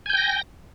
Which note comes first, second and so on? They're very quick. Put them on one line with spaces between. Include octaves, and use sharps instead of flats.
G#5 G6 G5 A#6